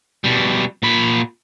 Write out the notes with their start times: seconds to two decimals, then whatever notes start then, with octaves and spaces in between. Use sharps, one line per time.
0.24 B2 G3
0.83 A#2 B5